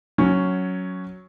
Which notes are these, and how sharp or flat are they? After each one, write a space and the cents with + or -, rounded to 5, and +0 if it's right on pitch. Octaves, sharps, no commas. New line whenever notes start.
F#3 +0 C#4 +0